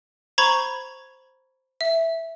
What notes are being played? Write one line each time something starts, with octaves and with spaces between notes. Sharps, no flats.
C5 A#5 B5 C#6 G#6
E5